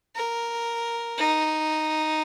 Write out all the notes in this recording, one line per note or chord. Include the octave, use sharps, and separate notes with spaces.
A#4
D#4